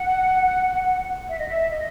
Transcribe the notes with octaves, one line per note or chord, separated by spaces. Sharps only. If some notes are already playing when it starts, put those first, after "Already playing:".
Already playing: F#5
E5
D#5
E5
D#5